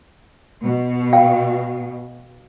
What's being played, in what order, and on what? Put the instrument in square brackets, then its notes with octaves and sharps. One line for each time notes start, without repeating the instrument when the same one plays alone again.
[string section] B2
[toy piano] F5 G5